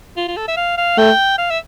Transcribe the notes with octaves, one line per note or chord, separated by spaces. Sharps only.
F4
F4
A4
E5
F5
F5
A3 G5
F5
E5